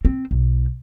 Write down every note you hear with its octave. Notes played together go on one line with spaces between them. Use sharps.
C4
B1